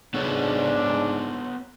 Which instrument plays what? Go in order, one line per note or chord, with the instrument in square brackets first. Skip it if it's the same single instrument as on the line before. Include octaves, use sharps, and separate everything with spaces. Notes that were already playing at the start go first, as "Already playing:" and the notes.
[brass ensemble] G#2 D4 [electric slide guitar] B3 A4 C#5